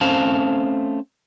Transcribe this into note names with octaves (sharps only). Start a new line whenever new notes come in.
A3 C4 C#4 C5 F5 A5